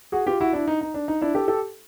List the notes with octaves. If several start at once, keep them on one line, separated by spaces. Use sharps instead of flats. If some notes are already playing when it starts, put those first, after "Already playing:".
F#4 G#4
F4 G4
E4 F#4
D4 E4
D#4
D#4
D4
D#4
D4 E4
G4 A4
G4 A4